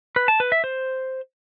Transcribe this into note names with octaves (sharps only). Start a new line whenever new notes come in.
B4
A5
B4
E5
C5